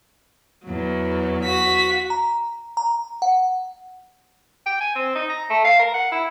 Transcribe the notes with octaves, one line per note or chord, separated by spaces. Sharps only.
E2 F#3
F#4 B6
A#5
A#5
F#5
G5
G#5
C4
D#4
A#5
A3
F5
A#4
F#5
E4